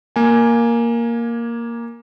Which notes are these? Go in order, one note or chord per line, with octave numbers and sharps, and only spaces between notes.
A#3 G#5